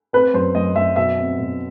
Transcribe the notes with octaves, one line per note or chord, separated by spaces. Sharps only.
C4 B4
F#2 C5
F#2 D#5
F#2 E5
B2 E5
C4
B2